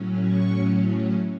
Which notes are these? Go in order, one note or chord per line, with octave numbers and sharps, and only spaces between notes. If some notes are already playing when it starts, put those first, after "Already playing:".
Already playing: A2 F#3 C#4
C#6